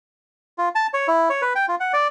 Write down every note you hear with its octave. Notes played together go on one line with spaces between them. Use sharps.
F4
A5
C#5
E4
C#5
B4
G5
F4
F#5
D5